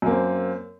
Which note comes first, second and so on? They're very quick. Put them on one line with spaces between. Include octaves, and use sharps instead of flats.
F#2 A#3 C4